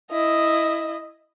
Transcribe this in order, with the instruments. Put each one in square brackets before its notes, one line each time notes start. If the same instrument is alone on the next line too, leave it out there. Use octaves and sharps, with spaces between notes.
[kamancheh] E4 D#5